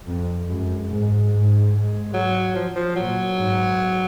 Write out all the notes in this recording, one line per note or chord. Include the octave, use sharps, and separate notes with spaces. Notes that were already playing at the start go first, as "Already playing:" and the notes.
F2
F#2 G#3
G#2
G#2
F#3
F3
F3
A#2 F#3
G#2